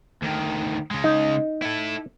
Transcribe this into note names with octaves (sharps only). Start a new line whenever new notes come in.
D2 D#3
C#3 G#3
D#4
E4 A4